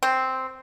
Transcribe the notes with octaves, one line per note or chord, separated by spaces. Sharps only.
C4